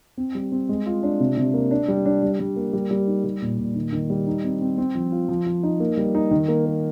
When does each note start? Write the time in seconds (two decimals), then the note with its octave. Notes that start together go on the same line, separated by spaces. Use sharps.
0.18 C4
0.35 G3
0.52 C4
0.69 G#3
0.86 F4
1.03 D4
1.20 C3
1.37 C3
1.54 A#3
1.71 D4
1.88 G3
2.06 D4
2.23 G3
2.40 G3
2.56 A#3
2.73 G3
2.91 G3
3.07 D#4
3.24 G3
3.42 A#2
3.59 A#2
3.75 D#3
3.92 D#3
4.10 G3
4.27 D#4
4.44 C4
4.61 C4
4.78 C4
4.95 F3
5.12 F4
5.29 F3
5.46 F3
5.63 D#4
5.80 A#3
5.97 G3
6.15 D#4
6.31 D#3
6.48 A#3
6.66 A#3